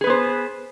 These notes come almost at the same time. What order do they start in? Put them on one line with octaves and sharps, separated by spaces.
G#4 B4 B3 C5